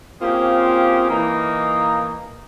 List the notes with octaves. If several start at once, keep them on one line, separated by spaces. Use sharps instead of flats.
A#3 C4 C#4 F4 G4 G#4
E3 A#3 D#4